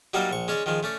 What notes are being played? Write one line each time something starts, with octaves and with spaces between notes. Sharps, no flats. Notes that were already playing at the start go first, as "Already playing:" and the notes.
F#3 G3 A#3 D#4 D5 D#5
A#1 C#6
G#3 C#4 C#5 D5
D#3 F3 G#3
A3 C#4 D5